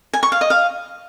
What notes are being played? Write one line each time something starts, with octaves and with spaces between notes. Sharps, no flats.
G#5
C#6
F5
D#5
F5